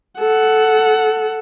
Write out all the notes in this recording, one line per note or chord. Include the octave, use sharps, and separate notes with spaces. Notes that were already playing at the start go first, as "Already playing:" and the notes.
A4 F#5